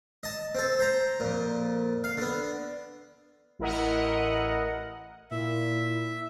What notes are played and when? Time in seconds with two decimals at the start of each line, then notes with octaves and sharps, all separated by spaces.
0.23 D#5 A5
0.55 C4 A4
0.79 C5 A#5
1.20 F2 A#2
2.04 F5
2.17 D3 B3
3.59 A1 E4 A#4 D#5 F#5
5.31 A#2 E4 E5